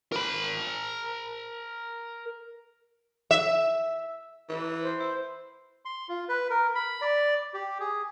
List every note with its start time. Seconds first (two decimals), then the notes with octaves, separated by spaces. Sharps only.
0.12 A#4 B5
3.31 E5
4.49 E3
4.82 C5
5.00 E4
5.85 C6
6.09 F4
6.29 B4
6.50 A#4
6.75 B5
7.02 D5
7.54 G4
7.80 G#4